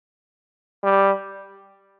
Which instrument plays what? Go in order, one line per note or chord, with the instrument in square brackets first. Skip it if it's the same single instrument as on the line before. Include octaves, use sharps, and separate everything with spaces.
[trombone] G3